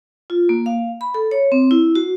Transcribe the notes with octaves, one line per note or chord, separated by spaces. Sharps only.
F4
A#3
F5
B5
A4
C#5
C4
E4
F#4